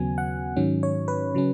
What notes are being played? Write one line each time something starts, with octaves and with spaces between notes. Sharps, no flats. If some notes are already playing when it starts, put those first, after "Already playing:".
Already playing: D#2 C#3 F#3 B3 G#5
F#5
G#2 D#3 F#3 C#4
C#5
B4
C#3 F#3 C#4